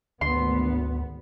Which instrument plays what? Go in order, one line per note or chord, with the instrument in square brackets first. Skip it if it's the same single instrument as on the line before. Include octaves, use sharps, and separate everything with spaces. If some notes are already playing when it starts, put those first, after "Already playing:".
[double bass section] G#1 B3 [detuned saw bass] D2 [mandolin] C6